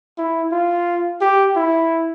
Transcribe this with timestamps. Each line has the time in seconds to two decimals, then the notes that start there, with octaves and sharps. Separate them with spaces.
0.18 E4
0.52 F4
1.21 G4
1.56 E4